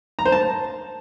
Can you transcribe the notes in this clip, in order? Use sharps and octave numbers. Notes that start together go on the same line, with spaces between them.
A#5
C5
A5